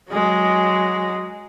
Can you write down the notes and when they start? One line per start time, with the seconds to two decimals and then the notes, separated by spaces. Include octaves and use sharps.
0.11 F#3 G#3